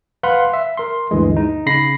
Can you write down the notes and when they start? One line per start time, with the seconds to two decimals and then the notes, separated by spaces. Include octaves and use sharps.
0.23 B4 F5 F#5 B5 C6
0.53 E5
0.77 A#4 C6
1.11 D2 G2 E3 G#3
1.37 D#4
1.66 C#3 B5 A#6 C7